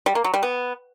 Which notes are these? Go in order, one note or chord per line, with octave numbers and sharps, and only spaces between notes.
G3
A#3
F#3
G3
B3